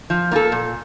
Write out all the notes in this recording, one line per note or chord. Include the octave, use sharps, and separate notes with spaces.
F3
A#3 F4 A4
A#2